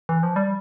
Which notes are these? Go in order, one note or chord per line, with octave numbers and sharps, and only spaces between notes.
E3
F3
G3